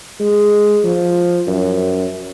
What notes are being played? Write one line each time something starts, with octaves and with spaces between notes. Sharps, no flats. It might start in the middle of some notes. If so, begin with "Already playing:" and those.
G#3
F3
F#2